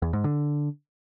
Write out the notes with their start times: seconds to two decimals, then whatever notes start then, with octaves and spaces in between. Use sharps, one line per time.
0.02 E2
0.13 G#2
0.24 D3